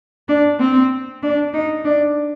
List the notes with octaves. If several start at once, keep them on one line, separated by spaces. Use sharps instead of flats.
D4
C4
D4
D#4
D4